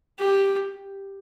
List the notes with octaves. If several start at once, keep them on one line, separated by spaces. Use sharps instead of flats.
G4